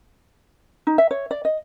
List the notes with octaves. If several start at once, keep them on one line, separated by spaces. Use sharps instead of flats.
D#4
E5
C#5
D5
D#5